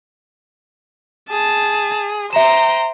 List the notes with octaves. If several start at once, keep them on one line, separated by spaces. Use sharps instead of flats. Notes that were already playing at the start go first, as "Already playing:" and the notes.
G#4 A5
C5 E5 G5 A#5 E7